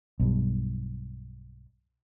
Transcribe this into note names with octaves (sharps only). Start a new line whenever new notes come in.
B1 G2